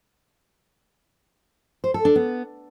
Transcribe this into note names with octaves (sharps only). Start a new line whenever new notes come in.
C5
A4
D4
B3